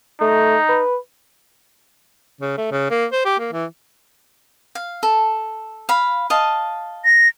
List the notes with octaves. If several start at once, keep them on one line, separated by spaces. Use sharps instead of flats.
A3 D#4
B4
C#3
A3
C#3
A#3
C5
G4
A#3
E3
F5
A4
F5 B5
D#5 F5 A5
A#6